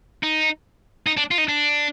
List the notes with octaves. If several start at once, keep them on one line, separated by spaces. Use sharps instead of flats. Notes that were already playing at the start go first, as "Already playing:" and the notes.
D#4
D#4
D4
F4
D#4
D4